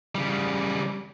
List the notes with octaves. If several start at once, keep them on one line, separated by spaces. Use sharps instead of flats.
C#3 G3